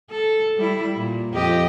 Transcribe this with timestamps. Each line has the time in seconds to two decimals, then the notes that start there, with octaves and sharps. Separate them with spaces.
0.10 A4
0.57 G3 E4
0.96 A#2
1.33 F2 G4 D#5